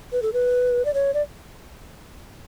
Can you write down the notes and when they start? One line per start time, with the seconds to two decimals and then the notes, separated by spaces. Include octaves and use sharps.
0.12 B4
0.22 A4
0.33 B4
0.85 D5
0.94 C#5
1.14 D5